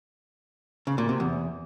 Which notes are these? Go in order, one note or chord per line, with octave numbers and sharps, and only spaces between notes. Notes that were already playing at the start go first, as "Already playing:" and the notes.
C#3
A#2
C3
E2